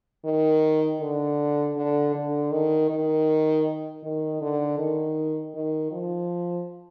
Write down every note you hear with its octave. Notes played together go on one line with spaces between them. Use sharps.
D#3
D3
D3
D3
D#3
D#3
D#3
D3
D#3
D#3
F3